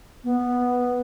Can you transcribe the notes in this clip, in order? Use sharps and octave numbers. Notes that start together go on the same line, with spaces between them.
B3